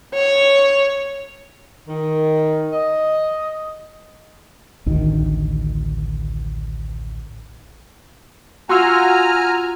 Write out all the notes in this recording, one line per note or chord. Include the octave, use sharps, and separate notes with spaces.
C#5
D#3
D#5
A1 D2 D#3
F4 F#4 F#5 G#5 A#5 C6 E6 F6